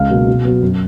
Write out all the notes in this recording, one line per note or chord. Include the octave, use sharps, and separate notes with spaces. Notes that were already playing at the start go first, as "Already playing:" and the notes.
Already playing: C#2 F5
B2 F#3 A#3
B2
F#3 B3
F#2